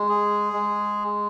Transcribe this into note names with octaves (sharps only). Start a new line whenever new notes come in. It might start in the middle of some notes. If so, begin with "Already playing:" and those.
Already playing: G#3
G#4
G#3